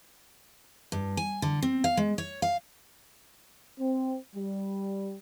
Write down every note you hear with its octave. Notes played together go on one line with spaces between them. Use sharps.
G2
G#5
D3
C4
F5
G#3
C#5
F5
C4
G3